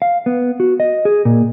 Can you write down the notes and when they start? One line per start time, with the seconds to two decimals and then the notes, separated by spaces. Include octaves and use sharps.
0.02 F5
0.26 B3
0.60 F#4
0.80 D#5
1.05 G#4
1.25 A#2